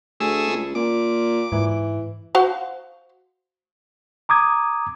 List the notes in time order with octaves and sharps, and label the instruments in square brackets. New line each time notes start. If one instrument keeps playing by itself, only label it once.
[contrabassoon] D2 [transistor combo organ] A3 G#4 E6
[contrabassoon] C#2
[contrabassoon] A#2 [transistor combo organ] D6
[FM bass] G#2 [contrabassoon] E3
[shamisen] F#4 C5 F5
[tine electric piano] A#5 D6 D#6 G#6